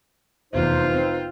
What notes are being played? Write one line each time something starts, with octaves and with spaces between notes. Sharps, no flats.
F1 E2 D#4 F4 B4 C5
C4